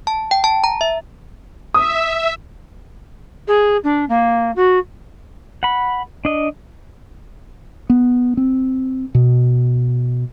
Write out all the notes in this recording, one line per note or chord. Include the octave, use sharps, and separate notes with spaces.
A5
G5
A5
A#5
E5
E5 D#6
G#4
D4
A#3
F#4
F#5 B5
D4 D#5
B3
C4
B2